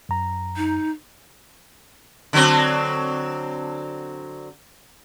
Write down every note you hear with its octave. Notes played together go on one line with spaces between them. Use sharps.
F#2 A#5
D#4
D3 F#3 C4